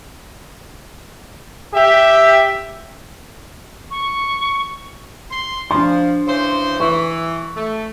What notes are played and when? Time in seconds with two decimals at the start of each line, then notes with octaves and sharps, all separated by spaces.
1.74 G4 E5
3.91 C#6
5.31 C6
5.71 F3 D4 C6
6.28 C#3 E3 C5
6.80 E3 C#6
7.57 A3